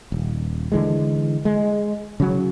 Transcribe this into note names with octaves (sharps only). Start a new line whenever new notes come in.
D#1
D3 E3 G#3
G#3
C#3 F#3